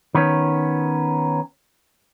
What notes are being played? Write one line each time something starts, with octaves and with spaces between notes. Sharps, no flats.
D#3 B3 C#4